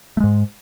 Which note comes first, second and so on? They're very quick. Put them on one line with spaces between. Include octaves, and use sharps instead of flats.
A3 G#3 G#2